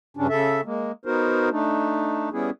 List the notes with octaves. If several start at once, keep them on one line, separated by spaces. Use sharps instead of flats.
G2 C#3 C#4 D4
C#3 A4 E5
G#3 A#3
B3 D#4 F#4 A#4 C5
A3 D4 D#4
G3 B3 C#4 E4 G#4